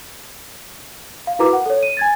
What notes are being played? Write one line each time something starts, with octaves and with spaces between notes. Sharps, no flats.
F5
E4 F#4 A#4 B4 A#5 D6
F#5
A4 C#5
D#7
G#5 G#6 A6